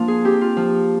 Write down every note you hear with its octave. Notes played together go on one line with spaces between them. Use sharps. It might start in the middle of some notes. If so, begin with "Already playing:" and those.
Already playing: F3 A#3 D4 F4
G#4
C4 G4
F4
F3